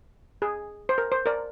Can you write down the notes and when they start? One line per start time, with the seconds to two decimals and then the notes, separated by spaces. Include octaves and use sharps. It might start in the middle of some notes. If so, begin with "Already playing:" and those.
0.42 G#4
0.89 C5
0.98 A#4
1.12 C5
1.26 A#4 D5